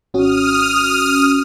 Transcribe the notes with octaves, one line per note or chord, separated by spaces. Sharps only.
G#1 C#4 F#4 D#6 F6